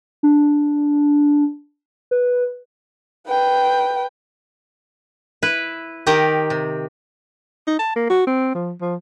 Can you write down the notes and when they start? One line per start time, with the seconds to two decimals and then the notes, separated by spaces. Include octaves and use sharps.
0.23 D4
2.11 B4
3.27 B4 G5
5.43 E4 B4
6.07 D#3 G4 A#5
6.50 C3
7.67 D#4
7.79 A5
7.96 A#3
8.10 F#4
8.27 C4
8.55 F3
8.81 F3